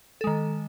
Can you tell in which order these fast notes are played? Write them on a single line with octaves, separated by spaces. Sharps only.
A4 G#3 D#3